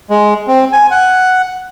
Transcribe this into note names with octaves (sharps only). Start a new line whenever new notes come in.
G#3
C4
G#5
F#5